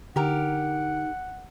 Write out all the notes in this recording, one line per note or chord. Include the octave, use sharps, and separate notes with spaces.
D3 D#4 G4 A#4 F#5